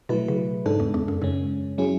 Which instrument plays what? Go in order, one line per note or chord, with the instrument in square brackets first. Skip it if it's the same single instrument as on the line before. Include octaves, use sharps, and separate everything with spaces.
[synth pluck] B2 [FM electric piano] F#3 A3 E4 B4
[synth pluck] C#3
[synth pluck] G#2 [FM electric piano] C#3 G#3 D4 A4
[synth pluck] E2
E2
F#2
[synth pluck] F#2 [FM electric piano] C#3 G#3 C#4
[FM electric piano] F#3 C#4 E4 G#4